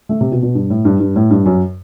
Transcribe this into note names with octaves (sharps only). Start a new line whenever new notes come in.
A3
C3
B2
B2
G2
A2
G2
G2
A2
G2
F#2